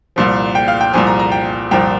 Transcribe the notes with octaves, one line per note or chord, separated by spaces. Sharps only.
C2 A#2 F3
G5
F5
G5
C2 A#2 F3 G#5
A#5
A#5
G5
C2 A#2 F3 G5